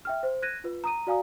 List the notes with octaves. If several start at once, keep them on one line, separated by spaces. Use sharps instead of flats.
E5 G5 F6
C5
F#6 G#6 A#6 D#7
F4 B4
A#5 D#6 D#7
F#4 D5 F5 G#5 A#5 D#6